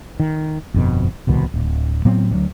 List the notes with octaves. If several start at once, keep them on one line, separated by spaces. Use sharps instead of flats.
D#3
G1 F2 B2
D1 C2 B2 D#3
D1
A2 F#3 B3 C4
D2 F#3